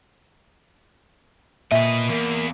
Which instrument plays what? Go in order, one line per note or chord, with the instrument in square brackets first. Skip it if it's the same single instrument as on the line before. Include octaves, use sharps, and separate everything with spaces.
[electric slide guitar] A#2 [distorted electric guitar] B4 D#5 [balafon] E5
[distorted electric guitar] E2 [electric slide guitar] A#3